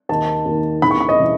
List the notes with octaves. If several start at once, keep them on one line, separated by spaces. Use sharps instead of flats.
D#2 D#3 A5
D#2 D#3
D#2 C#3 E3 B5
C#6
B5
D#5
C#3 E3